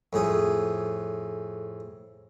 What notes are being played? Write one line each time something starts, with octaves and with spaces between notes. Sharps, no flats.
F2 A2 G#4